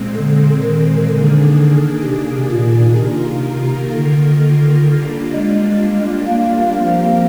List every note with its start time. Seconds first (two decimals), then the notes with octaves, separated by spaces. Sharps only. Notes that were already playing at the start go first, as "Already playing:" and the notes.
Already playing: A#2 G#3 C4
0.16 D3
0.63 D#3
1.10 D3 D#3 A#3 D4 G#4
2.05 C3
2.51 A#2
2.98 C3 D#3 A#3 F4 A#4
3.93 D3
4.87 G3 A#3 D4 F4
5.34 G#3
6.28 A#3
6.75 F3 A#3 C4 G4 A#4